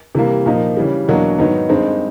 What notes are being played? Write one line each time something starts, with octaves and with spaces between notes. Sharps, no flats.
C3 E3 G3 A#3
A#2 F3 A#3 D#4
C#3 E3 G3
E2 B2 F#3 A#3 D4
G#2 D#3 F#3 B3 D#4
G2 D#3 G#3 C4 D#4